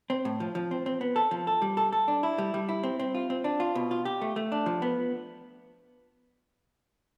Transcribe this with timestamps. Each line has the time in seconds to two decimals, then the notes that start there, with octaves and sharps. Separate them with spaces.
0.10 C4
0.25 A2
0.40 F3
0.55 F3
0.71 C4
0.86 C4
1.01 B3
1.16 A4
1.31 F3
1.47 A4
1.62 G3
1.77 A4
1.92 A4
2.08 D4
2.23 E4
2.38 G3
2.54 G3
2.69 E4
2.83 C4
2.99 C4
3.15 F4
3.30 C4
3.44 D4
3.60 F4
3.75 B2
3.91 F4
4.05 G4
4.21 A3
4.36 A3
4.52 D4
4.66 F3
4.82 B3